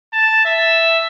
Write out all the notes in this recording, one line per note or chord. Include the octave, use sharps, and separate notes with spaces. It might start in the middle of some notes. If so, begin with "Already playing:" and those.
A5
E5